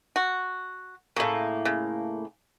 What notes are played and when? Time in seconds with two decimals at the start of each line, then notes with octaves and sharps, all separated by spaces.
0.16 F#4
1.16 A2 C#3 A#3
1.65 C#3